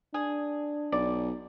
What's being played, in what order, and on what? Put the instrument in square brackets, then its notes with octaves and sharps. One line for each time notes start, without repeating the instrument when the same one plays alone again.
[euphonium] D4 [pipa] G#4
[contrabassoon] B1 [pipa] D5